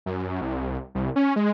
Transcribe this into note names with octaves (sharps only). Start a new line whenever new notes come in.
F#2
C2
C2
C#4
G#3